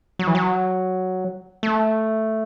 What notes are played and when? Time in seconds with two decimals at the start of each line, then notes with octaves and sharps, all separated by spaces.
0.19 F#3
0.27 E3
0.35 F#3
1.63 A3